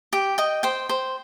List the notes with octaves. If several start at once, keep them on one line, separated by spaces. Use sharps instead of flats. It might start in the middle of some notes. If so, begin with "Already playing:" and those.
G4 G5
D#5 G5
C5 G5
C5